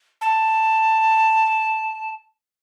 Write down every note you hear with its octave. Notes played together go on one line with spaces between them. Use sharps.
A5